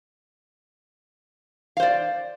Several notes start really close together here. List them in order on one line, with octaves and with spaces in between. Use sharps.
F5 C5 D5